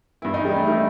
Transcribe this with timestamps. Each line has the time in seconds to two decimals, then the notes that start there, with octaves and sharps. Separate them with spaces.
0.22 G2 E3 E4
0.34 D#4
0.45 G3
0.56 A3
0.64 D#4
0.68 E3 E4